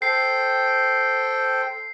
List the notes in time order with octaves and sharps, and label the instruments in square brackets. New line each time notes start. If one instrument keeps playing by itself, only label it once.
[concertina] A4 C5 G5 [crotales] C7